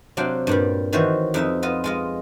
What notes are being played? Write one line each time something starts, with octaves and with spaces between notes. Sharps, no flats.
C3 F#3 D4 F5 G5 C6
G2 A#2 G3
D#3 E3 F#4 C5 C#5
F2 D#4 E5
B3 F4 D#5
G#3 F4 D#5